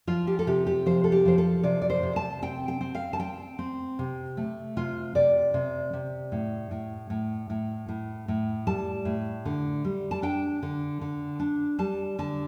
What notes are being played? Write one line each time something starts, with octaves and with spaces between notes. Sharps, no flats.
F3 F4
G4
A4
C3 G4
G4
F3 C5
A4
G4
F3 C5
A4
C3 D5
D5
C5
C3
A5
C4 G5
G5
C4
F5
A5
C4 G5
C4
C3
A3
C3 F4
C3 D5
C3
C3
A2
A2
A2
A2
A2
A2
G3 A5
A2
D3
G3
A5
D4 G5
D3
D3
D4
G3 A5
D3 A5